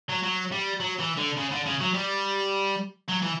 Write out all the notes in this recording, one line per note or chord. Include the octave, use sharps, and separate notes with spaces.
F#3
F#3
G3
F#3
E3
D3
C#3
D3
C#3
F#3
G3
F#3
E3